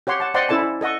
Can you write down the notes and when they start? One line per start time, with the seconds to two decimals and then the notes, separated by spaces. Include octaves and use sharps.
0.07 G4 C#5 F#5 C6
0.20 F#5 A5
0.34 C5 D5 D#5 F#5 G5 C6
0.49 C#4 E4 A4 D5 A5
0.63 E4
0.81 A4 D#5 F#5 C#6